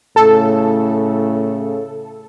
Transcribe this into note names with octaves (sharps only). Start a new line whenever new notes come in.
A2 C#3 A4